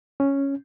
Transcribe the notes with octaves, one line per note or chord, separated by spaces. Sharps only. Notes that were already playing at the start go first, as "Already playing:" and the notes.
C#4